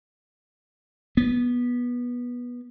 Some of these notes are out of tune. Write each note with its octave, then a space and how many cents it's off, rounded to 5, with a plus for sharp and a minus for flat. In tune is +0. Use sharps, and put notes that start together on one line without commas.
B3 -15